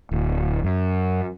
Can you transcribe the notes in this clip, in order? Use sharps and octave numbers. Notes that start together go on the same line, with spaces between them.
D1
F#2